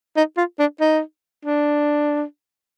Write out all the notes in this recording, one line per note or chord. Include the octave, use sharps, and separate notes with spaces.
D#4
F4
D4
D#4
D4